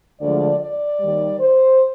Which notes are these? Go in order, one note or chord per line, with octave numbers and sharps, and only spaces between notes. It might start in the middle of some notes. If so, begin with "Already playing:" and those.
D2 D3 F3 G#3 D5
D5
D#2 D#3 G3
C5